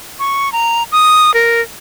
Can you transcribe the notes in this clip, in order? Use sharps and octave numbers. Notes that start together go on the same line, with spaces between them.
C#6
A#5
D#6
A#4